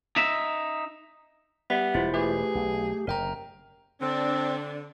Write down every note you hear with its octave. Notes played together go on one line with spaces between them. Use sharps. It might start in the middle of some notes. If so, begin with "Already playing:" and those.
D#4 E5
G3 B3 G4 E5
E1 E4 F4 C5
A3 G4 G#4 B4
B1
F#1 F#2 C3 A#4 G5 A#5
D3 C4 D4